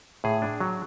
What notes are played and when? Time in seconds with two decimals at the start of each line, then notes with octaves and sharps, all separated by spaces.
0.24 A2 G#4
0.42 D4
0.60 F#3